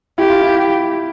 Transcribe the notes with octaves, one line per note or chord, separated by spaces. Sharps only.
E4 G4
F4
E4